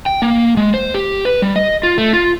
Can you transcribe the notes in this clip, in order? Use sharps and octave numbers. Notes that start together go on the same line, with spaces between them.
G5
A#3
G#3
C5
G4
B4
G3
D#5
F4
A3
F4